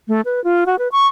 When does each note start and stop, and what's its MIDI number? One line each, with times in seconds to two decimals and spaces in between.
0.08 0.21 57
0.25 0.43 71
0.44 0.64 65
0.66 0.78 66
0.79 0.88 71
0.92 1.07 85